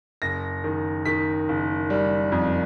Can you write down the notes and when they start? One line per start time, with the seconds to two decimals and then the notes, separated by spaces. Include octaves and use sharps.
0.22 F#1 A#6
0.64 D#3
1.05 D#3 B6
1.49 F#1
1.90 G3
2.32 F2